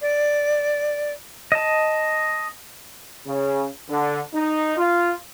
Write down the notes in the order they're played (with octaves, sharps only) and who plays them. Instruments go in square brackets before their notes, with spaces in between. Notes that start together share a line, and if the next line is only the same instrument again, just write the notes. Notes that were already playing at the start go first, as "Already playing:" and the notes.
[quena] D5
[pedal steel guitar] D#5 A5
[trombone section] C#3
D3
D#4
F4